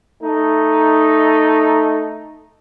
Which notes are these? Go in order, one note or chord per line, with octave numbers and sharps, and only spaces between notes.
A3 D#4